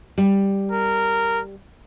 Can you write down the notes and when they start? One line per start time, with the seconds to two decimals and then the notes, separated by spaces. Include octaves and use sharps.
0.18 G3
0.72 A#4